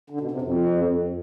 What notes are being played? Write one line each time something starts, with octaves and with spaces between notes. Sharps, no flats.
D3
B2
C3
F2